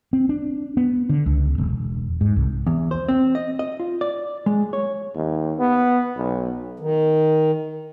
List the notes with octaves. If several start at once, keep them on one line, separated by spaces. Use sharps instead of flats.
C4
D4
B3
D3
C#2
E1
G#2
C2
E2
C5
C4
D#5
D#5
F4
D5
G#3
C#5
D#2
B3
B1
D#3